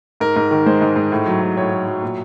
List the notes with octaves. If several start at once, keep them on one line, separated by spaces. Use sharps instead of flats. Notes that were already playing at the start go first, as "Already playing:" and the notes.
G#2 A#4
G#2
D#3
G#3 C5
G#2
G#2
A2
F#3
A2
A2 C#5
A2
F#3
A#2